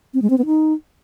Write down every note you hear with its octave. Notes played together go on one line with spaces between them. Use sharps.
C4
G#3
C4
B3
D#4